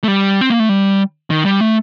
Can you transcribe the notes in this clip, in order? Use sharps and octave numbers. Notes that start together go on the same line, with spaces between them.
A3
G3
C4
A#3
A3
G3
D#3
G3
A3